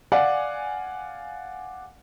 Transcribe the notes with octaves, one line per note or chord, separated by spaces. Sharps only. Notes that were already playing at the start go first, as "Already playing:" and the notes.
D5 F5 F#5 G#5